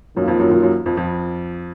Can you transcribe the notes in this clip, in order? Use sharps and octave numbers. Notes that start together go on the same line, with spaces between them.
F#2 D#3 F#3 A#3 F4
F2 F3
F#2 F#3
F#2 F#3
F#2 F#3
F2 F3
F2 F3